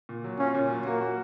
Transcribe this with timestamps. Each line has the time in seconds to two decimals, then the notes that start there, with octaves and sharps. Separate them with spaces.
0.09 A#2
0.24 F#3
0.39 C#4 F4
0.55 A#2
0.70 F#3
0.86 A#3 F#4
1.01 F#4